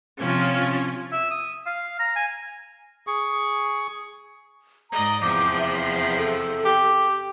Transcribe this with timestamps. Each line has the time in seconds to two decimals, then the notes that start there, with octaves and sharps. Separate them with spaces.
0.20 C3 F3 C#4 F4
1.12 E5
1.31 D#6
1.66 F5
1.99 A#5
2.15 G#5
3.07 G#4 C#6
4.91 G#2 D5 D#5 A#5
5.22 E2 C3 F3 D6
5.59 E5
6.18 A4
6.65 G4